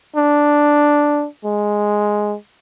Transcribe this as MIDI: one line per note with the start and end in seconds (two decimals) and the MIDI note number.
0.16 1.26 62
1.45 2.36 56